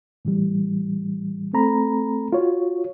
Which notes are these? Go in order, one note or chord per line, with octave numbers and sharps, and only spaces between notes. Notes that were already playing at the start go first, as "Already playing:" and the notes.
A2 E3 G3
A3 C4 A4 A#5 B5
F4 F#4 C#5